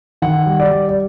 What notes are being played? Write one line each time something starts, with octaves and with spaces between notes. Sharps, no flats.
D#3 F#5
G3
D5
G3
D5